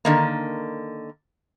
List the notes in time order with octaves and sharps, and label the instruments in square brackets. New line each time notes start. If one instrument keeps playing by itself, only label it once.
[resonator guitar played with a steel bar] D3 D#3 A#3